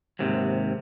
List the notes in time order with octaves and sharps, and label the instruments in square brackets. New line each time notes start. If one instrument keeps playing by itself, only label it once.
[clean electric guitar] D#2 G#2 C3